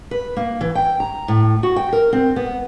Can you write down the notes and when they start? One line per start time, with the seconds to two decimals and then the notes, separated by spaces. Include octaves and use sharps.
0.11 B4
0.37 A#3
0.61 E3
0.75 G5
1.00 A#5
1.28 A2
1.63 F#4
1.76 G5
1.93 A#4
2.13 C4
2.36 B3